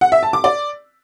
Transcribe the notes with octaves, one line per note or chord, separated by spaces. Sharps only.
F#5
E5
A5
D6
D5